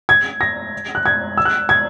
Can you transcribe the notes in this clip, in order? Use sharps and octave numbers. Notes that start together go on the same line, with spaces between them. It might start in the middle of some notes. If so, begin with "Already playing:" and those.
G#6
A#6
F#6
G#6
E6
F#6
G#6